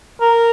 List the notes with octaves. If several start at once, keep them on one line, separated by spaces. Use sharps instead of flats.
A#4